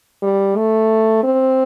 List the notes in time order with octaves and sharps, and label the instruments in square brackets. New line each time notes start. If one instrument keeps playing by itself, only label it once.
[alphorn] G3
A3
C4